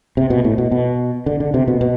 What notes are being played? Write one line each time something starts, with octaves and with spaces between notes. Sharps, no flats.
C3
B2
A2
B2
B2
D3
D3
C3
B2
B2